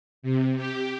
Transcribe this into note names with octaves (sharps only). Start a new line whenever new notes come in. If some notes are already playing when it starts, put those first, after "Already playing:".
C3
G4